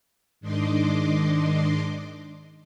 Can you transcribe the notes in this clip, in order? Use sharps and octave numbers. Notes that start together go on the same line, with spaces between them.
G#2 D#3 D4 D#5 C6 D6